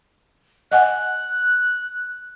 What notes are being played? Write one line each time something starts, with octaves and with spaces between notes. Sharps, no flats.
D#5 F#5 G#5 F#6